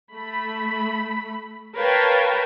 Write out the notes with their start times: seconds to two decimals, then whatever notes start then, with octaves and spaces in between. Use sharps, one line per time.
0.13 A3 B5
1.77 A#4 B4 C#5 F5 G5 A5